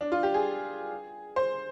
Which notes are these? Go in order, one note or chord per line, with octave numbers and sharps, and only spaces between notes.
D4
F4
G4
G#4
C5